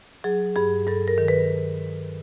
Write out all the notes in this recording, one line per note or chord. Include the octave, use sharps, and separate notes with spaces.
F#3 G#4
G2 G#4
G2 A4
A#4
D#3
B4